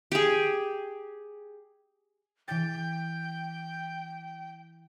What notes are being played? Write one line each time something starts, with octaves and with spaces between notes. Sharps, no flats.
G4 G#4
E3 G5 A6